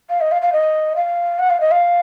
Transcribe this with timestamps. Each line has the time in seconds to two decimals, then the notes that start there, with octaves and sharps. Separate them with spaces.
0.10 F5
0.21 D#5
0.32 F5
0.42 F5
0.53 D#5
0.96 F5
1.39 F#5
1.50 F5
1.61 D#5
1.71 F5